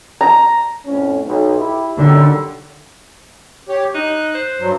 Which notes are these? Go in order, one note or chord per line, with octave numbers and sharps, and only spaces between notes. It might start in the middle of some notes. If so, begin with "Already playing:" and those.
A#5
F2 A2 C#4
B1
E4 G4
F#2 D3 D#3 G3
G4 C#5
D#4 F#6
C5
G2 F#3